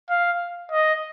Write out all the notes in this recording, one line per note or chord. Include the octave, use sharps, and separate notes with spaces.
F5
D#5